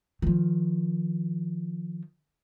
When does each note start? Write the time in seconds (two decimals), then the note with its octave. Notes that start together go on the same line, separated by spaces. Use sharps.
0.22 D#3 F3